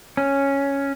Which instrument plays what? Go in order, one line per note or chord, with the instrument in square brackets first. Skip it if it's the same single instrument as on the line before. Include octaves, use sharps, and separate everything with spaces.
[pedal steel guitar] C#4